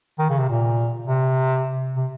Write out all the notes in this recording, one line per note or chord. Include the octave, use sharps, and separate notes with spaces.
D#3
C#3
C3
A#2
C3
C3